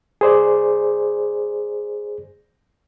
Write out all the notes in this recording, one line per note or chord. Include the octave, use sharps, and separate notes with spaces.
G#4 C5 D5